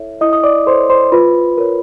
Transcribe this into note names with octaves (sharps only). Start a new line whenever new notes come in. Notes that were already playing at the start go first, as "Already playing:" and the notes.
Already playing: E4 A4 C#5 E5
E4 D#5 D#6
D#6
D5 D6
A4 C5 C#5 C6
C5 C6
F4 B4 B5
A#4 C#5